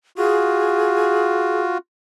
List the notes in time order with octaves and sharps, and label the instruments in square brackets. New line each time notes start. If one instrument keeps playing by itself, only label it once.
[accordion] F4 F#4 [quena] G#4